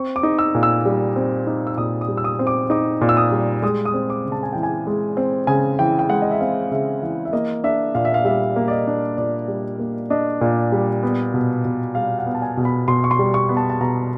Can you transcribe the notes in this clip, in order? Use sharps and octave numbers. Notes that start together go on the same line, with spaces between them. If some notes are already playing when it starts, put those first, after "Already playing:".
Already playing: C4 C#6
D6
D#4
E6
A#2
E6
G3
C4
D#4
E6
A#2 D#6
D#6
G3
E6
D#6
C4
D6
D#4 D6
A#2
E6
D#6
G3
G#3 D#6
D#6
C4
D6
C#3
A5
G#5
E3 G5
G#5
G#3
C4
C#3 G#5
E3 G5
G5
G#3 F#5
D#5
E5
C4 F5
C#3 E5
E3 F5
E5
A#3 D#5
D4 E5
A#2 F5
E5
F5
G3 E5
A#3
D5
D#5
D4
A#2 D5
G3
A#3
D4 D#5
A#2
G3
B3
B2
B2
G3 F5
F#5
B3
A5
G#5
B2
B5
B2 C6
C#6
C6
G3
C#6
B3
A5
A5
B2 A#5